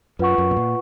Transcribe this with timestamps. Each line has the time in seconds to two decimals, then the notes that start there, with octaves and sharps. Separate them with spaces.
0.19 F#2 F4 B4 F#5 C#6
0.38 F#2
0.51 B2
0.57 A#2